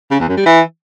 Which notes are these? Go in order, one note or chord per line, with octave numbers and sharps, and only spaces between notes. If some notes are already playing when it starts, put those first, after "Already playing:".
C#3
E2
F#2
G3
E3